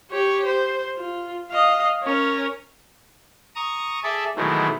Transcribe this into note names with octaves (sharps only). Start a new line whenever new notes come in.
G4 C#5
C5
F4
D#5 F5
C#4 A#4
A#5 C#6 D#6
G#4 A4 D5 E5 A5
B2 D#3 E3 F#3 G#3 A3